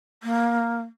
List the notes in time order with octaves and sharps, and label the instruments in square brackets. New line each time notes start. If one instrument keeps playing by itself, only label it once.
[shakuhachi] A#3